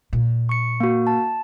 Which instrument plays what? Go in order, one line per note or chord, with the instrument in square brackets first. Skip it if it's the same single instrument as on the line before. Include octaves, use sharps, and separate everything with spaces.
[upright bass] A#2
[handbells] C#6 C#7
A#3 F#4
A5